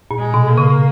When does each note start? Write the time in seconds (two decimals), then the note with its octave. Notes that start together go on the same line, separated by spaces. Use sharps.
0.11 A#2
0.19 G#3
0.34 B2
0.49 A#3
0.58 C#3